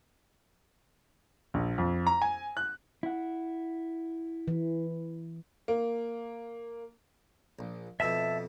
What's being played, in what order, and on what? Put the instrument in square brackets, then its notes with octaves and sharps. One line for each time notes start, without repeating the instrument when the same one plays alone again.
[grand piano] A#1
F2
A#5
G#5
F#6
[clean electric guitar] E4 F#5
[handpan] E3
[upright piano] A#3
[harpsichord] A#1
[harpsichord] F2 B2 [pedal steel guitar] E5 A5 E6